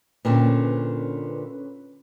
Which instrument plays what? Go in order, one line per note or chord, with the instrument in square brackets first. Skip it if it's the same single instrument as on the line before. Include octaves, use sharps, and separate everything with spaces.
[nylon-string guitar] A#2 D3 C4 [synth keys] C#4 B4